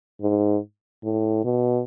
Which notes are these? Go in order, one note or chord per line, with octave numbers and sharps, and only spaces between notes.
G#2
A2
B2